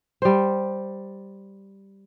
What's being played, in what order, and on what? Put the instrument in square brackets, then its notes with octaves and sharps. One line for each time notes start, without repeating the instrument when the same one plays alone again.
[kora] G3 C5